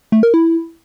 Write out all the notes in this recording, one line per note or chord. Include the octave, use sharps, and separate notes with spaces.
A3
A#4
E4